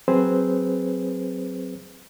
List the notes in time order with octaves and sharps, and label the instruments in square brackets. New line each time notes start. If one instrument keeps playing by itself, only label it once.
[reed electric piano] F#3 C4 G#4 B4 C5